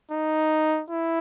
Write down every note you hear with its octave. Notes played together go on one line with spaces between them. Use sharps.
D#4
E4